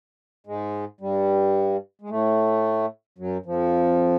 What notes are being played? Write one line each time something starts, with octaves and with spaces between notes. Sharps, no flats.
G#2 G#3
G2 G3
G#3
A2 A3
F#2 F#3
F2 F3